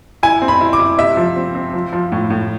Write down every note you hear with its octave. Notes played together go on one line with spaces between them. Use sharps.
E4 G#5
C4
B5
E4
D6
E4
C3 E5
F3
C4
C4
F3
F3
A2
A2